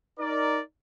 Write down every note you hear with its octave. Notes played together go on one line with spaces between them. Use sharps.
D#4 A#4 D5